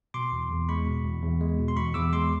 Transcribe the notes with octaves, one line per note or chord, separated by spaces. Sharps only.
B2 C6 D6
E2
E2
G#3 B5 C#6
B2
E2
E2
G#3
B2
C6
E2 B5 C#6
E2 D6 E6
G#3 C6 D6